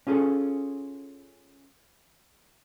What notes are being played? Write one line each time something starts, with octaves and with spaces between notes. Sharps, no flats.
C#4 F4 G#4 A4